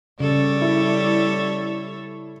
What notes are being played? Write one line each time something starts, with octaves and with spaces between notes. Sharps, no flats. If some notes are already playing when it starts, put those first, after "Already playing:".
C#3 G3 A4 C#5 D5
E4